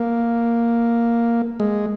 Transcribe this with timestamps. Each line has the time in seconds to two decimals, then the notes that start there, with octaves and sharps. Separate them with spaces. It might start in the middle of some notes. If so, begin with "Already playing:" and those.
Already playing: A#3
1.60 G#3